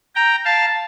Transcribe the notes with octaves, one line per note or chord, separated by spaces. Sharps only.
G5 A#5
F5 A5